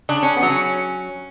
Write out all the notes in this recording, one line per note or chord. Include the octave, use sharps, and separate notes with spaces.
C#3 D4
C#4
B3
F#3
C#4